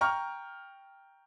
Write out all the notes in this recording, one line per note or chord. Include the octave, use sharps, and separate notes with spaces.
G5 A#5 C#6 F6